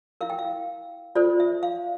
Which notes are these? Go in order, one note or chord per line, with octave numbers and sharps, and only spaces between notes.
E4 A#4 F5
G5
F5
F4 A4 C5 D5
E5
F5